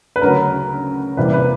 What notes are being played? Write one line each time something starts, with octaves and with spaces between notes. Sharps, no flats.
B4
D2 C#3 F#3 A#4
E2 C3 E3 G3 A#3 B4
B4